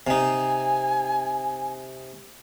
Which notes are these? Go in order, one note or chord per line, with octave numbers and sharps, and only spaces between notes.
C3 D#4 G#5